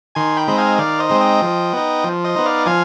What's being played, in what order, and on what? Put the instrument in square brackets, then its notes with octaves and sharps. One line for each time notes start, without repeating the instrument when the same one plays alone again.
[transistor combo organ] D#3 G#5 C6
G5 B5
G#3 C4 D#4 B5
F5 G#5
D#3 D5 F5
C5 D#5
G#3 C4 D#4
D#5 G5
F3
B3 D#4
F3
C5 D#5
B3 D#4
D5 F5
F3 F5 G#5